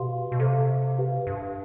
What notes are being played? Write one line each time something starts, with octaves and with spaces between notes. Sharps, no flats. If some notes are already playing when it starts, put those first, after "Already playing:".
Already playing: B2 G4 B4 F5 C6
B2
C3 A4 C5 F5
G4 B4 F5
G2